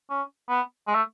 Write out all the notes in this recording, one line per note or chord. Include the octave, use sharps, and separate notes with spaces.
C#4
B3
G#3
A3